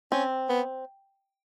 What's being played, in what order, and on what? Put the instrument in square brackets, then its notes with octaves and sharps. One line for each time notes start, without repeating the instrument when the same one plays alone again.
[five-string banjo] C4 [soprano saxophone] C#4
[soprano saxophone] B3